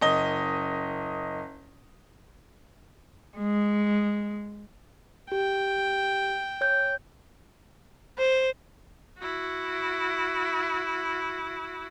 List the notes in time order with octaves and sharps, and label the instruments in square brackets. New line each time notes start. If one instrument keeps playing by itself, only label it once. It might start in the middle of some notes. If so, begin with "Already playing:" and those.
[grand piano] F#1 D#5 G7
[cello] G#3
[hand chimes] G4 [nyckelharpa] G5
[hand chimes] C#5 G6
[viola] C5
E4 F#4